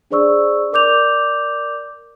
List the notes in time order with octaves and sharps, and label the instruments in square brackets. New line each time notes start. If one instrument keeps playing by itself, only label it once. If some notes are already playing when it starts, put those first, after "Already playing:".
[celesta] D4 G#4 C5 D5 C#6 E6
A#4 D5 D6 G6 F7